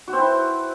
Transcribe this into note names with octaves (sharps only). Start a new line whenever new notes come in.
F#4
C4
E4